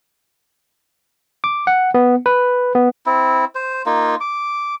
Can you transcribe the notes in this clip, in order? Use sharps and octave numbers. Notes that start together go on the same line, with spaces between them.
D6
F#5
B3
B4
B3
C4 E4
C5
A#3 D#4 F4
D6